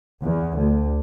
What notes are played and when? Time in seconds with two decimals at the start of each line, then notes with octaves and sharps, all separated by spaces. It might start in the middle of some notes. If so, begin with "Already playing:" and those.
0.23 E2
0.57 D2